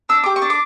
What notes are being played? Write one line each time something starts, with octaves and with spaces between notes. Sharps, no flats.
D4 E6
G4 D6
C#6
D4
D6